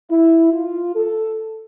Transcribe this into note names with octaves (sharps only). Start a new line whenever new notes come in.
E4
F4
A4